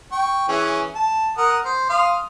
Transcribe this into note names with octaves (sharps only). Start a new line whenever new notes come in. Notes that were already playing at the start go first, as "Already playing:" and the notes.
G5 C#6
E3 C#4 G#4
A5
A#4 F#5 D#6
C5
F5 C6 D#6